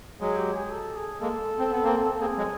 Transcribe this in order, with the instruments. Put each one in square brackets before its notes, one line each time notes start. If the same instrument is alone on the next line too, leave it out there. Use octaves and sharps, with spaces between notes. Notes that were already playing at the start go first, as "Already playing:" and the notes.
[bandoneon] F#3 G#3 [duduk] G#4
[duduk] G4
G#4
A4
G#4
[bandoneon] G#3 A#3 [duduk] A4
[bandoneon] C4
B3
A#3 C4
[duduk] A4
[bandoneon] A#3 C4 [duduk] G#4
[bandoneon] F#3 G#3